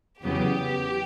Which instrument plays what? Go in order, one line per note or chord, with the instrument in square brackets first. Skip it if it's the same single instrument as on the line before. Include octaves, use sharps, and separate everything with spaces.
[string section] E2 C#3 F#3 B3 G4